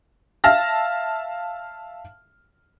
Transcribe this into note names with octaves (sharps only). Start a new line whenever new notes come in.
E5 F5 A5 F6 A#6